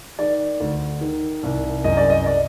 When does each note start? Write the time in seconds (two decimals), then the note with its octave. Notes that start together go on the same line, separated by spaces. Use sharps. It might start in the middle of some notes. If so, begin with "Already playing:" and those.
0.19 D#3 D5
0.60 D2
1.01 D#3
1.43 C2
1.84 F#2 D#5
1.97 D5
2.10 D#5
2.26 D5